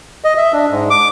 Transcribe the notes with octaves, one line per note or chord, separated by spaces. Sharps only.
D#5
E5
D4
G#2
D6